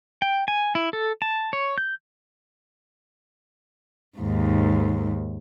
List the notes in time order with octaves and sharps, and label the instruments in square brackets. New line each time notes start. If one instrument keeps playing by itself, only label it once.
[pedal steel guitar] G5
G#5
E4
A4
A5
C#5
G6
[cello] D#2 G#2